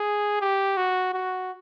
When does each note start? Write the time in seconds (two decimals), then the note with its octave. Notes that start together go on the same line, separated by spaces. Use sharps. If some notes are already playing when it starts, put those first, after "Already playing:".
Already playing: G#4
0.41 G4
0.77 F#4
1.14 F#4